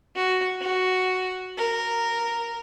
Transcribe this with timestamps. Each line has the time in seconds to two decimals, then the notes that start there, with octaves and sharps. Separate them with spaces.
0.16 F#4
0.61 F#4
1.57 A#4